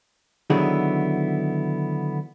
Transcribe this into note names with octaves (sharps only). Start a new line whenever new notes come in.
D3 D#3 F#3 B3 E4 G#4